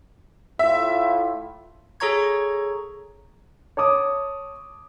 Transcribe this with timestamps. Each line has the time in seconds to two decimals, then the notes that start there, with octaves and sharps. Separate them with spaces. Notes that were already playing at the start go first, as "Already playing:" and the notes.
0.59 A2 F4 E5
2.00 G#4 A4 C#5 A#5 C#6 G#6
3.77 C#5 A5 D6 D#6